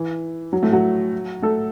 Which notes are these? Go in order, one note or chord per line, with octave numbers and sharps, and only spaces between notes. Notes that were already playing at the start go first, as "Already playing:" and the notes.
Already playing: E3
F#3
A2 A3
F#3 F#4
A3 A4